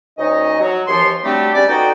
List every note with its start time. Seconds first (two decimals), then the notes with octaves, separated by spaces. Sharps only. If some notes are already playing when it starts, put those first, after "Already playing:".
0.18 D2 C#4 D#4 C#5 D#5
0.60 F#3
0.87 D#2 C3 E3 F3 C#5 C6
1.24 F#3 G3 A3 C4 D4 G4
1.55 G#2 G3 A3 C#4 D5
1.68 B3 D#4 F#4 A4 D5 G5